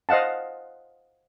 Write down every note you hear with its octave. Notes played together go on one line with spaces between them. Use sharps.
C5 D#5 F5 F#5 A5